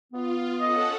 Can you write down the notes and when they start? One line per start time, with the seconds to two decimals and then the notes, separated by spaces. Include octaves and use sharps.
0.13 B3 F4
0.61 C#4 A4 D#5 F#5